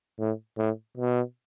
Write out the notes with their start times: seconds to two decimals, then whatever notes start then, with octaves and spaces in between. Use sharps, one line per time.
0.20 A2
0.58 A2
0.97 B2